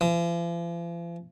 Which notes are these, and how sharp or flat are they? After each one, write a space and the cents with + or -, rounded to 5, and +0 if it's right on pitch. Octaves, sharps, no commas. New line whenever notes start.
F3 -45